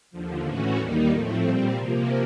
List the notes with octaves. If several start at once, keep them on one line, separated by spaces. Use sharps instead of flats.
D#2 D3 F3
A2 E3 A3 C#4 F#4
D#2 D#3 G3 A#3 D#4
A2 F3 A3 C4
A#2 G3 C4
C3 F3 A#3